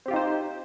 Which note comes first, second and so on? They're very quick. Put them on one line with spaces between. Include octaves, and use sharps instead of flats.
C4 G4 F4 D#4 C5